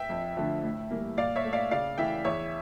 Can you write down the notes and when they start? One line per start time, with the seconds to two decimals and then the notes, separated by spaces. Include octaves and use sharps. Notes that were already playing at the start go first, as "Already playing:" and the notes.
Already playing: E5 G5
0.09 F2
0.37 D3 F3 A3
0.64 A2
0.91 E3 G3 A#3
1.17 A#2 D5 F5
1.36 C#5 E5
1.45 A3
1.53 D5 F5
1.71 C#3 D5 F5
1.98 E3 A3 E5 G5
2.25 E2 C#5 E5